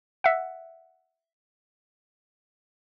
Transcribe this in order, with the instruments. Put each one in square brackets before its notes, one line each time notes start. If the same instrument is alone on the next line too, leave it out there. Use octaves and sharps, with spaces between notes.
[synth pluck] E5 F#5